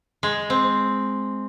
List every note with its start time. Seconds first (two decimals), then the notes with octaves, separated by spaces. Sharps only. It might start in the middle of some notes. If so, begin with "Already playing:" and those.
0.23 G#3
0.50 C4